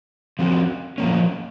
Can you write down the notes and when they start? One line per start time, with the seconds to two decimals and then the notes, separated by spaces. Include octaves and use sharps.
0.39 F3 C4 F#4
0.98 A#2 F3 A#3 C#4